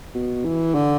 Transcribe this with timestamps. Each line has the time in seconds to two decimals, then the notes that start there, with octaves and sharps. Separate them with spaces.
0.15 B2
0.45 E3
0.74 D3